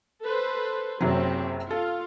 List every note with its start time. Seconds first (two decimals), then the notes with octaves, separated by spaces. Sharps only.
0.24 A4 B4 C5
1.01 F#1 C3 F#3 C4 C#4
1.71 F4 A4